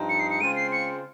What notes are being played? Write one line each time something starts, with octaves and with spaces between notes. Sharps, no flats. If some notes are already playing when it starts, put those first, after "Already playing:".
Already playing: G2 F3 C4 D#4
C#7
C7
C#7
C#3 G#3 C4 F4 C5 D#7
C7
C#7